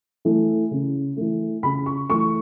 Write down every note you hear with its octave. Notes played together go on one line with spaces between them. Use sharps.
E3 A3
C#3
E3 A3
C#3 B5
C#6
E3 A3 C#6